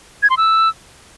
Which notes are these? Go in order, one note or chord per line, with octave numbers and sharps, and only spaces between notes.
G#6
C6
E6